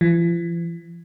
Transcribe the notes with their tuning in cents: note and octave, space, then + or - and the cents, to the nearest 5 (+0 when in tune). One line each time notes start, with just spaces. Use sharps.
F3 -45